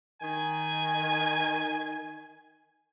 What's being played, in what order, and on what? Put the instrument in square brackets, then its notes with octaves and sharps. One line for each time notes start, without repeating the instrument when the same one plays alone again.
[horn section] D#3 G#5